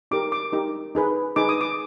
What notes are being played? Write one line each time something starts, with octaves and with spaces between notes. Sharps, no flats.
D#4 G4 A#4 D6
D6
D#4 G4 A#4
D#4 G#4 B4
D#4 G#4 B4 D6
D#6
D6